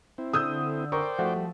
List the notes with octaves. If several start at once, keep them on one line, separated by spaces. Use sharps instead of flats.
C4 E4
D3 D#6 E6 G6
A#4 C5 D5 G5 C#6
F3 A3 F#4
G3